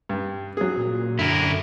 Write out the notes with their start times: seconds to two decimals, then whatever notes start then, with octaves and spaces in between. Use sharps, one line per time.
0.09 G2
0.57 F#3 G#4
0.77 A#2
1.19 F#2 D3 E4 A#4